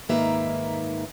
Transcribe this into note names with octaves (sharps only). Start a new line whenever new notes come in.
G#2 D#3 A#3 B4 E5 A#5